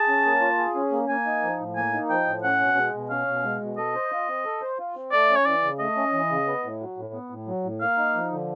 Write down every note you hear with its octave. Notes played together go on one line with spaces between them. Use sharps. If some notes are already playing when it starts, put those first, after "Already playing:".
Already playing: G#4 A5
C#4
A#3
F4
G#4
C#4
A#3
A#3 G#5
D#4
F3
A2
A#3 G#5
D#4
F3 G5
A2
C#4 F#5
B2
G#3
B2
C#4 F5
B2
G#3
B2
A4 D#5
C5
F4
C4
A4
C5
F4
C4
A3 D5
C#4
C#5
E3 D5
C#3
A3 D#5
C#4
E3
C#3
B3
A2
F#3
A2
B3
A2
F#3
A2
A#3 F5
D#4
F3
D3